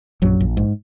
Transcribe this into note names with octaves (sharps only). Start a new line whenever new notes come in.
A#1 F#2 F#3
A#1
G#2